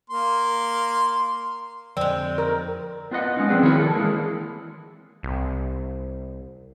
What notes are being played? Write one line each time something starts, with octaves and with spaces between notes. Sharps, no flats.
A#3 C6
F2 D3 F3 G#3 C4 D5
A#4
B3 F4 B4 D#5 F#5
G#3 C#4 D#4
F3 C4 G#4 B4 D5
D#3 E4 F#4 A#4 C#5
A4
E3 G#3 A#3
C2